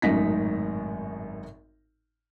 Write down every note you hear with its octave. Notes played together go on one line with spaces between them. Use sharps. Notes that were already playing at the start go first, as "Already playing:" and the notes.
G#1 F#2 A2 D#4 A#6 B6